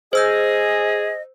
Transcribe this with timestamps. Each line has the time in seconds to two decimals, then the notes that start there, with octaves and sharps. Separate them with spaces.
0.13 G#4 C5 D#5 E6 G6